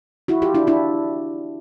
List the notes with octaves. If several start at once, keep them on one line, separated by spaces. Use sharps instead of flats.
E4 F#4
F4 G4
D4 E4
D4 E4